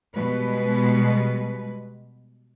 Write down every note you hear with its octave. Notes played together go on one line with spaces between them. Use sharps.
B2 G3 G#3 B4